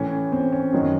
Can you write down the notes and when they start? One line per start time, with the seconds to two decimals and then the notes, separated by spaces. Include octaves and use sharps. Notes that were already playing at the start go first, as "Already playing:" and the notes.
Already playing: A2 E3 C#4
0.32 C4
0.53 C#4
0.72 F#2 D#3 F#3